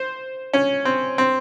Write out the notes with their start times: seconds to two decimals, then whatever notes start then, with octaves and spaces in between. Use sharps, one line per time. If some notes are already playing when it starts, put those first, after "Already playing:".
Already playing: C5
0.53 C#4
0.85 C4
1.18 C4